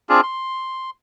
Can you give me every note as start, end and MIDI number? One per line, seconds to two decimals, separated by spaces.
0.09 0.21 60
0.09 0.21 62
0.09 0.21 65
0.09 0.21 68
0.23 0.90 84